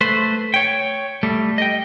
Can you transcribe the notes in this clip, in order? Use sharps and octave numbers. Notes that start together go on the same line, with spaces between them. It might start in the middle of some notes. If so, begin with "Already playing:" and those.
A3 B4 C5
C#5 G5
G3 A3
D#5 G5